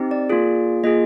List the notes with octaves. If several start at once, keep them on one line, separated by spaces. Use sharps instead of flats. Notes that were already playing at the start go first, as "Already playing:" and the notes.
Already playing: C4 D#4 G4
D5
A#3 F4 G#4
A#3 F4 G#4 D#5